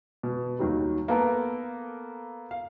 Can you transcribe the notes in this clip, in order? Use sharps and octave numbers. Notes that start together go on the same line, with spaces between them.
B2
D#2 D#3 F#3 G3
A#3 B3 A4 A#4
F5